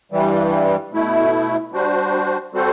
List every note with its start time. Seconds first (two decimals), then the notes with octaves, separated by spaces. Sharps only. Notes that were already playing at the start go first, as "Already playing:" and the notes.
0.12 G2 E3 G3
0.93 B2 A3 E4
1.72 G3 D4 F#4 C5
2.53 G3 C4 F#4 A4 C5